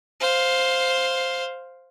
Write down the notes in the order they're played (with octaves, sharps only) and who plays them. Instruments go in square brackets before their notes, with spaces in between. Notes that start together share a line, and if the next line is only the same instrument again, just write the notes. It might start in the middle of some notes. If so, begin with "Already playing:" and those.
[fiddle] C5 F5